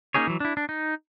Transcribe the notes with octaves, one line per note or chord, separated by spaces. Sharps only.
A#3 C#4 D#4 G#4 C#5
E3 F#3
D4 E4
D4
D#4